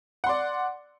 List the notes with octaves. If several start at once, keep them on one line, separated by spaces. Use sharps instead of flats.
D5 F#5 C6